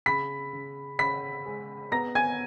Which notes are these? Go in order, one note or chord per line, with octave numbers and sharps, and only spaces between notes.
C#3 B5 B6
C#3
C#3 B5 B6
G#3
B3 A#5 A#6
G#5 G#6